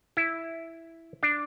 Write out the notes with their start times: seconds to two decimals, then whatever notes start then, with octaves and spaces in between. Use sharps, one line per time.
0.17 E4
1.23 D4